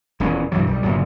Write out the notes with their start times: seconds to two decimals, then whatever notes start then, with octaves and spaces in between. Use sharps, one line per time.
0.20 D#1 E2 E3 C#4
0.52 B1 G2 E3 F#3
0.67 B1 G3
0.83 G1 A#2 C#3 F#3